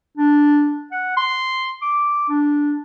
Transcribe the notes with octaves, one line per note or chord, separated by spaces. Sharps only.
D4
F#5
C6
D6
D4